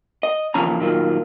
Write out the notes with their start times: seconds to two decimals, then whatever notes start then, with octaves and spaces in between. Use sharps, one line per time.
0.23 D#5
0.54 D#2 C#3 E3 F3 C#4 A#5
0.79 A#2 D#3 F#3 F4